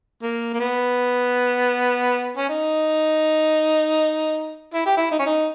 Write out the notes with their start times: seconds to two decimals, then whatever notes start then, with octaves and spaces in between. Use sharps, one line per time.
0.23 A#3
0.54 A#3
0.60 B3
2.37 C#4
2.49 D#4
4.74 E4
4.86 G4
4.97 E4
5.11 D#4
5.19 C#4
5.26 D#4